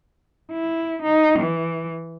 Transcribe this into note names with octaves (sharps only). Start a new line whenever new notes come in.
E4
D#4
E3